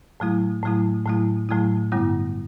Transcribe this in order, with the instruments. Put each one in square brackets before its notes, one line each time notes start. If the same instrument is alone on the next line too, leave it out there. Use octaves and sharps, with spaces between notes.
[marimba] A2 F#3 A3 E4
A2 F#3 A3 E4
A2 F#3 A3 E4
A2 F#3 A3 E4
G2 D3 G3 B3 E4